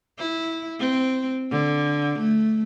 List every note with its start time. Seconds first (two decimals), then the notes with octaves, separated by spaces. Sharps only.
0.19 E4
0.80 C4
1.51 D3
2.19 A3